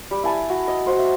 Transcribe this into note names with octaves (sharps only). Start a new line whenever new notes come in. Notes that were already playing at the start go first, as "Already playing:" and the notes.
G3
E4 E5 G#5 A5
F#4
D#5
F#4 C5
E5